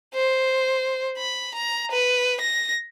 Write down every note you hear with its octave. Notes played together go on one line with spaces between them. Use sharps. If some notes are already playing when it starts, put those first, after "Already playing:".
C5
B5
A#5
B4
A#6